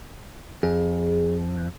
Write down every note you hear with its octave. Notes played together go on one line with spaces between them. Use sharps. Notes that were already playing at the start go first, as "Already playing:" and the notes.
F2 G#4